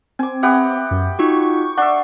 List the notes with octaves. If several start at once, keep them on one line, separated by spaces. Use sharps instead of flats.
C4 G#5 D6
B3 G4 E5 F#5
F#2
D#4 F4 F#4 C#6
D4 E5 F#5